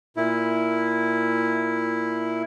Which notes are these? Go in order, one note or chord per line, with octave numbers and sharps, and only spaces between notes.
A#2 E4